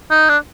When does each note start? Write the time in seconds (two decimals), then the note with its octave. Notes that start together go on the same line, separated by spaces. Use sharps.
0.11 D#4
0.29 D4